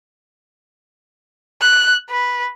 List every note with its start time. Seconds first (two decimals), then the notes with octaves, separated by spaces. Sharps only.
1.61 F#6
2.10 B4